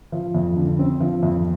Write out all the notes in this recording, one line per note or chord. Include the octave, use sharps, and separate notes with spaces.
F3
F2
D3
C4
F3
F2